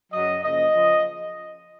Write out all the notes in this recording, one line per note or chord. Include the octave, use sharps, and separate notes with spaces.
F#2 C#3 F#3 D#5
F#2 C#3 F3 A#3 D#5
C#3 F3